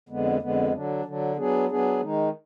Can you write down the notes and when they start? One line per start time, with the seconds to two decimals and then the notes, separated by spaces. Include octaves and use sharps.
0.09 F2 D3 G#3 B3
0.42 F2 D3 G#3 B3
0.73 D3 F#3 D4
1.05 D3 F#3 D4
1.37 F#3 B3 D4 G#4
1.69 F#3 B3 D4 G#4
2.00 D#3 G#3 D#4